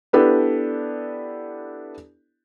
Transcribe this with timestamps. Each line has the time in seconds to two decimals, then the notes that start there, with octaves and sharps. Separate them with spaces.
0.13 B3 D4 E4 G4 A4 B4